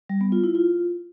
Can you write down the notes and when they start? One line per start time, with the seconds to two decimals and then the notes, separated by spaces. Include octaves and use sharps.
0.09 G3
0.21 B3
0.32 F4
0.44 E4
0.55 F4